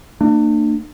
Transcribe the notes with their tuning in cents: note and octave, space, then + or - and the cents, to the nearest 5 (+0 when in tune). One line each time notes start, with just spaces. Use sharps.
A#3 -35 D4 +35